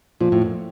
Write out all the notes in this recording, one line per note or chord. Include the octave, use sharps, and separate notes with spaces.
A#2 F3
A2
F#2